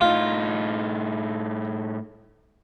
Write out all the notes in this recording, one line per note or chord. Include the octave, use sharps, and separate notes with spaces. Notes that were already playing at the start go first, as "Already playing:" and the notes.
A2 D#4 F4